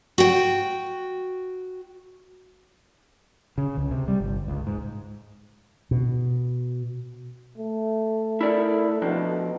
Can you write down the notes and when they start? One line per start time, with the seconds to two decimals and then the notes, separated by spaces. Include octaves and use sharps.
0.18 F#4 G5
3.58 C#3
3.77 C#2
3.91 C3
4.08 G3
4.20 G1
4.48 C#2
4.67 G#2
5.91 B2
7.57 A3
8.41 E4 A#4 D5
9.02 F2 B2 F3 D4